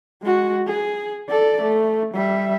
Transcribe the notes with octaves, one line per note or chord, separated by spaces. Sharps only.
G#3 F#4
G#4
A4 D5
A3
G3 E5